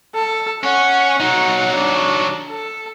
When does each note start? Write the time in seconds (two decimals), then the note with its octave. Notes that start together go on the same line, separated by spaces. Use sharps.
0.15 A4
0.63 C#4 F#5
1.20 F#3 D#4
1.74 D4
2.50 A4